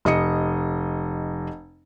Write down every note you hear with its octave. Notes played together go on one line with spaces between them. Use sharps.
F1 D#5 D#6 C#7